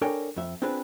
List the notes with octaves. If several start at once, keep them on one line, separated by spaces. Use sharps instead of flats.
D4 A4 A#4 C#5 G5 G#5
F2 E5
C4 D4 F4 G#4 B4